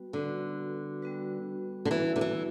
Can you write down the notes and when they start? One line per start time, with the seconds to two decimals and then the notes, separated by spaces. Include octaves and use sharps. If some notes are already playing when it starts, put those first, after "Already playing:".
Already playing: G3 B3 F#4 B4
0.13 D3 G3 B3 F#4 B4
1.02 G3 B3 F#4 B4
1.85 D3
1.91 E3 G3 B3 F#4 B4
2.16 D3
2.21 E3